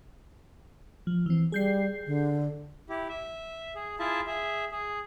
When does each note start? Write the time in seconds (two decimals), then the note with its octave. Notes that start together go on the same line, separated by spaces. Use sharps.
1.07 F3
1.26 E3 C4
1.52 G3 G#4 G6 C7
2.07 D3
2.89 E4 G4
3.09 E5
3.75 G#4
3.99 E4 F4 G#4 E5 A5
4.27 G#4 E5
4.72 G#4